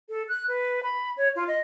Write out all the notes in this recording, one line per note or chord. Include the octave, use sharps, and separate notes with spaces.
A4
F#6
B4
B5
C#5
F4
D#5